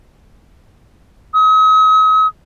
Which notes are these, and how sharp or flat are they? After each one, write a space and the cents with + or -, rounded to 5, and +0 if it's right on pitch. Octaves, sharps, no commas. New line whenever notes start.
D#6 +45